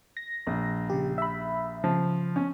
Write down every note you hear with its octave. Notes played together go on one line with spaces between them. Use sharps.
A#6
A#1
C#3 G4
E5 B5
C#3 F3
C#4